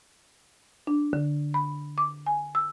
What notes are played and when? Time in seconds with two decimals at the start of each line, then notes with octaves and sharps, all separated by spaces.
0.87 D4
1.13 D3
1.54 B5
1.98 D6
2.26 G#5
2.55 E6